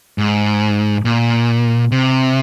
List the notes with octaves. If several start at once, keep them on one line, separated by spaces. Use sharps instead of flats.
G#2
A#2
C3